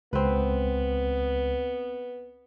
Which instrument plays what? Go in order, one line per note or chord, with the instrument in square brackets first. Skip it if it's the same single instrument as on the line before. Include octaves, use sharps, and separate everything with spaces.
[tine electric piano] C#2 [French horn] B3 [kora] C4 B4